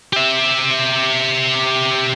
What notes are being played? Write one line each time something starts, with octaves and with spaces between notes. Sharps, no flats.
G4 E5